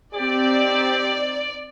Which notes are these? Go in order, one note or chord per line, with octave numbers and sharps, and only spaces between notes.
C4 D#4 G4 D5